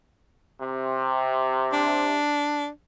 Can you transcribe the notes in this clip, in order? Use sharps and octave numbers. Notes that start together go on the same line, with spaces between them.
C3
D4